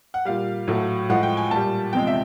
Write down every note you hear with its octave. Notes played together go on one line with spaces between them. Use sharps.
F#5
A#2 G3 F5
A2 F#3 A3
A2 F3 G#3 F#5
G5
G#5
A#2 G3 A5
E2 C3 F3 G#3 G5
E5